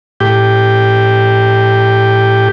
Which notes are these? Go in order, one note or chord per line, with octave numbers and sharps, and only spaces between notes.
A2 G4